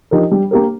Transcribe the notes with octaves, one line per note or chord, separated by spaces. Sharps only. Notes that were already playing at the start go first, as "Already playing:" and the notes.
F3 D#4 G4 A#4
G3
A#3 G4 A#4